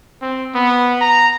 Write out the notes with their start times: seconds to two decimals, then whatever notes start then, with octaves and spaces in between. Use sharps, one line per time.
0.22 C4
0.54 B3
1.01 A#5